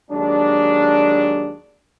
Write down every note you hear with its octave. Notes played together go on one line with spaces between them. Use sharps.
D#2 F#3 G#3 D4